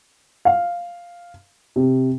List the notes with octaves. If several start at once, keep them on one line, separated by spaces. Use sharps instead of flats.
F5
C3